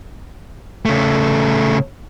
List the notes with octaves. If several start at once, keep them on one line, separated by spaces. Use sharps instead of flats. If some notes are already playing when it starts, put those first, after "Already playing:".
C#3 A3